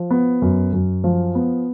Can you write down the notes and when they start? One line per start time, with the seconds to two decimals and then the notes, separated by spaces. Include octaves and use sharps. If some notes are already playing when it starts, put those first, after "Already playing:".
Already playing: F3
0.10 B3
0.42 F#2
0.73 F#2
1.04 F3
1.35 B3